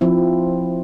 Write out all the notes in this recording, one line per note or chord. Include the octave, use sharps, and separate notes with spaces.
F3 C4 E4